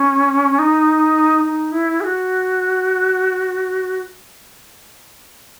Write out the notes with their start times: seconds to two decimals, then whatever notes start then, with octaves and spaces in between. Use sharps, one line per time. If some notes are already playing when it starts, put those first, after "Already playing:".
Already playing: C#4
0.59 D#4
1.44 D#4
1.72 E4
2.01 G#4
2.04 F#4